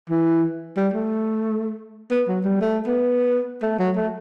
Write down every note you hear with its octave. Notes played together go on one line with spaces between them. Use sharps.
E3
G3
A3
B3
F#3
G3
A3
B3
A3
F#3
A3